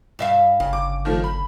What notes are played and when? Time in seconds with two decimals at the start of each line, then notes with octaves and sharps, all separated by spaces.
0.19 G2 E5 F5
0.60 G1 C#3
0.73 D6
1.05 D#3 F3 A3
1.24 B5